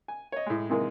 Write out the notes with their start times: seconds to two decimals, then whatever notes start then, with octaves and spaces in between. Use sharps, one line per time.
0.08 G#5
0.32 C#5 D#5
0.46 A2 G#3
0.70 C3 D#3 E3 G#3 A#3